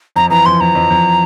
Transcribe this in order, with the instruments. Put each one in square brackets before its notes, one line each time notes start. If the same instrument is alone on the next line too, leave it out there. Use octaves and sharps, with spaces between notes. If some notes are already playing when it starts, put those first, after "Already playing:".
[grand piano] F2 [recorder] A#5
[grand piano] E3 [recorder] A#5
[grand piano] F2 [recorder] C6
[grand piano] F2 [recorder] A#5
[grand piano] F2
F2